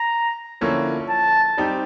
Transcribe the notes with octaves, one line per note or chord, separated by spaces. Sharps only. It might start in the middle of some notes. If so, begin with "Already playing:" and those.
Already playing: A#5
D3 F3 A#3 C#4 E4
A5
G3 C4 D#4 G4